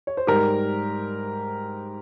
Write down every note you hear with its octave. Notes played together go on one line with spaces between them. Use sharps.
C#5
C5
G#2 G3 G4 A#4